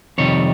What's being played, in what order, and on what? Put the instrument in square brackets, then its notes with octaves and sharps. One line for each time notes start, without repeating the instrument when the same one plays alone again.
[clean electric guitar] F2 C3 D#3 G3 C#5